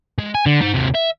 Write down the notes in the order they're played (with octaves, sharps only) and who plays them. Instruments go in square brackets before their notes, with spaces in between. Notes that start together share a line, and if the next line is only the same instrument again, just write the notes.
[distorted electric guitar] G#3
G#5
D3
D#4 C5
D#2 C3
E5